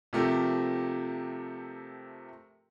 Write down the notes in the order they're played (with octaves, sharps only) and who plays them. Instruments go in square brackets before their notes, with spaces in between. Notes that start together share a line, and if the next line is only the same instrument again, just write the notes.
[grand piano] C3 F3 A3 G4 A#4